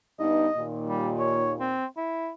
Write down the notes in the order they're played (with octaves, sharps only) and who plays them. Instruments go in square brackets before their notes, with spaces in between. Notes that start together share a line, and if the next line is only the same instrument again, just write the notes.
[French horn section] G2 B3 D#4 [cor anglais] D#5
[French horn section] D#2 A#2
[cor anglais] G3
C#5
C4
E4